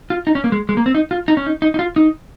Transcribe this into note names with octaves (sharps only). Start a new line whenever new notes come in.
F4
D#4
C#4
A#3
G#3
G#3
A#3
C4
D#4
F4
D#4
C#4
D#4
D#4
D#4
F4
D#4